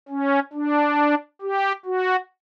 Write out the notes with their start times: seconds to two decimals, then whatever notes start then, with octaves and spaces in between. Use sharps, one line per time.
0.09 C#4
0.53 D4
1.41 G4
1.85 F#4